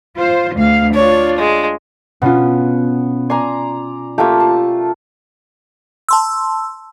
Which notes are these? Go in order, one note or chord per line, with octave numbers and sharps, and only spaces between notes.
F4 C5
D2 F5
D4 F4 C#5
G#3
B2 B3 C#4 F4
D5 G#5 A#5 C6
A3 A#3 F4 G4 G#6
A5
A5 C6 E6